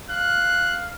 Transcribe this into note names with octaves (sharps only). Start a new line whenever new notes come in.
F5 F#6